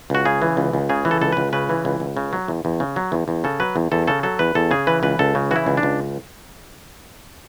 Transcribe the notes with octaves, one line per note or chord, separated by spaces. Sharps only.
C#2 F#4
C#3 G#4
E3
C#2
C#2
C#3 G#4
E3
A4
C#2 A4
C#2 B4
C#3 B4
E3
C#2
C#2
C#3
F#3
E2
E2
C#3
F#3
E2
E2
C#3 A4
F#3 B4
E2
E2 A4
C#3 A4
F#3 A4
E2 B4
E2 A4
C#3 G#4
E3 B4
C#2 B4
C#2 A4
C#3
E3 E4 F#4
C#2
D4
C#2